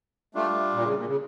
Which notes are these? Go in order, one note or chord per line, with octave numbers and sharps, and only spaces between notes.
G3 A3 D4 F4
A#2
C#3
A#2
C#3